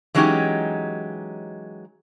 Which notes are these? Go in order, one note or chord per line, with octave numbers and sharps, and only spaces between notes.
E3 F#3 G#3 C#4 D#4 G4